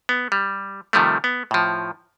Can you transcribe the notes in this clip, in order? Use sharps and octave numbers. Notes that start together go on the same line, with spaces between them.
B3
G3
C3 D#3 F3 G3 A3
B3
A2 F3